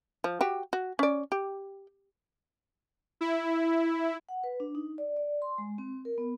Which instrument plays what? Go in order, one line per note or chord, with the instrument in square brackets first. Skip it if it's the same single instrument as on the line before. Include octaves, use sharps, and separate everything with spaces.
[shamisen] F3
F#4 G4
F#4
C#4 D5
G4
[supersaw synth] E4
[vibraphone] F#5
B4
D4
D#4
D5
D5
C6
G#3
C4
A#4
B3